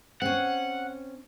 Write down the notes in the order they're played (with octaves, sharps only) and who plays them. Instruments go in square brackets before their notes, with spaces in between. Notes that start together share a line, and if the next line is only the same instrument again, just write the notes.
[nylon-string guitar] C4 C#4 [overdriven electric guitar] F#5